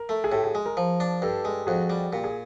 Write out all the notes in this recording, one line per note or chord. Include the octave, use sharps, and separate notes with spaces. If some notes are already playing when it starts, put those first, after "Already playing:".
Already playing: A#4
A3
G#4
A2 G4 A4
F#4 G#4
G#3
G#4 A#4
F3
D4
G2 G4 A4
G#3
F2 F#4 G#4
G3
A#2 G4
G#4